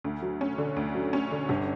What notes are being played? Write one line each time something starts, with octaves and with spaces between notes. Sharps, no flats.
D2
F#3
C#4
D3
D2
F#3
C#4
D3
G1